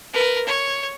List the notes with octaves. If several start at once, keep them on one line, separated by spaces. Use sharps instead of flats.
A#4 B4
C#5